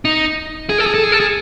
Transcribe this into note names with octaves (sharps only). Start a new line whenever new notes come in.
D#4
G#4
A4
G#4
A4
G#4
A4
G#4